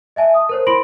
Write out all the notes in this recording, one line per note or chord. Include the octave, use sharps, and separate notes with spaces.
D#5 E5 G#5 A5
A5 D#6
A#4 C5 C#5
E4 B5 C6 A#6 D7 F#7